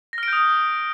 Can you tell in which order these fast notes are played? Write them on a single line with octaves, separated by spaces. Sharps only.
A#6 F6 D7 G6 D#6